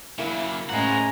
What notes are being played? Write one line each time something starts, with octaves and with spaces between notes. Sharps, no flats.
C#3 F#3 A#3 E4
A2 G#3 C#4 C5 F#5 A#5